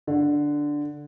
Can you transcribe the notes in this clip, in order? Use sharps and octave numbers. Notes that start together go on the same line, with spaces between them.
D3